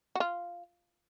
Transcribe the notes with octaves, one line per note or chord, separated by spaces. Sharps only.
F#4
F4